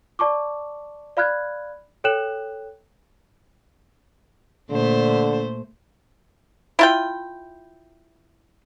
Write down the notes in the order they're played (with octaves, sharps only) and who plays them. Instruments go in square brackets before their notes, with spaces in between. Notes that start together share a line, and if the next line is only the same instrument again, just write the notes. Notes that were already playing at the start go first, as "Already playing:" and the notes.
[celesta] D5 A5 C#6 D6
D5 F5 B5 F6 F#6 G#6
A4 C#5 G5 F#6 E7 F#7
[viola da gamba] A#2 A3 C5 [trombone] D3
[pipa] E4 F4 G5